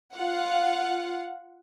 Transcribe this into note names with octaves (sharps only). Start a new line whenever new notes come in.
F4 F5 F#5